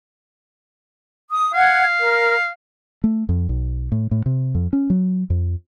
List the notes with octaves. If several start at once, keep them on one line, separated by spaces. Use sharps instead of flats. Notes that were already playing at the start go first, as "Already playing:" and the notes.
D#6
F5 F#5 G#6
A#4
A3
F2
B1
A2
A2
C3
F2
C#4
F#3
F2